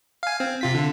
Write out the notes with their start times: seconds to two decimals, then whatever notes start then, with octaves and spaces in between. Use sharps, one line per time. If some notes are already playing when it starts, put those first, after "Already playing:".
0.23 F5 G#5
0.40 C4
0.61 C3 F4 B6
0.75 D3